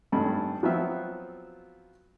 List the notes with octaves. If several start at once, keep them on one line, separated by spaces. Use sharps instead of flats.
G#1 G2 A3 B5
F3 F#3 B3 C4 F4 E5